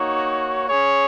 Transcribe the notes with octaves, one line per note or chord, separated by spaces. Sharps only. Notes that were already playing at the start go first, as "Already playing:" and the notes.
Already playing: A#3 D#4 F#4 C#5
C#4 G#4 C#5